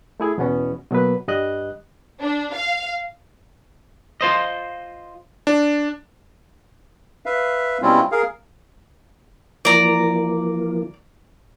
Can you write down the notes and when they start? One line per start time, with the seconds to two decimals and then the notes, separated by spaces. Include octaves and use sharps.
0.20 A3 E4 G#4
0.38 E2 B2 B3 C#4
0.90 B2 F#3 A#3 B4
1.28 G2 G3 D#5 F#6
2.21 D4
2.53 F5
4.21 F4 C5 D#5
5.47 D4
7.26 B4 E5 F5
7.82 B2 G3 C4 C#4 E4 F4
8.12 G#4 A#4 F5
9.65 E3 F3 A#3 D5 A#5